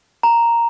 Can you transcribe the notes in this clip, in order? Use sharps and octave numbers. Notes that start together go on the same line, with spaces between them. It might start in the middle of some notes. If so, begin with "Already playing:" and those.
A#5